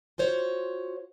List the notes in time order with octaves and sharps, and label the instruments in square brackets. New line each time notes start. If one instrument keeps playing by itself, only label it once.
[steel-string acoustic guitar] F4 F#4 C5 C#5